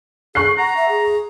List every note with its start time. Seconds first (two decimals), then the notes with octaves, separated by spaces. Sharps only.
0.35 G#4 C#6 F#6 C7
0.58 F#5 A#5
0.77 E5
0.89 G#4